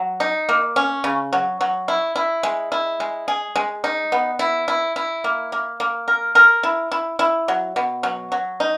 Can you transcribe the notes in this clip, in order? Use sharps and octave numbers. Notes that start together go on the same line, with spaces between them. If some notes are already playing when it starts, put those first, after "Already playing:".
Already playing: F#3
D#4
A#3
C#4
C#3
F#3
F#3
E4
E4
G#3
E4
G#3
G#4
G#3
D#4
B3
E4
E4
E4
A#3
A#3
A#3
A#4
A#4
E4
E4
E4
F#3
B2
F#3
F#3
D#4